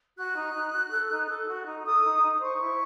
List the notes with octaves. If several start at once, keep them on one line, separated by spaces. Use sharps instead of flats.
F#4 F#6
D#4
D#4
F#4
A4
D#4
A4
F#4
D#4
A4 D#6
D#4
D#4
C5 C#6
E4